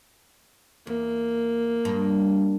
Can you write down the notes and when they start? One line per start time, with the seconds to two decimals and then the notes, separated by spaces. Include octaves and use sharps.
0.87 E2 A#3
1.85 G2